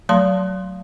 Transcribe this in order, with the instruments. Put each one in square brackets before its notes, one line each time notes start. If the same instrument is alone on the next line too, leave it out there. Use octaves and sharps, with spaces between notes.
[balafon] F#3 A3 A5 C6